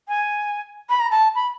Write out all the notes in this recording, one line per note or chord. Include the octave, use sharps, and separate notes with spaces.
G#5
B5
A#5
A5
B5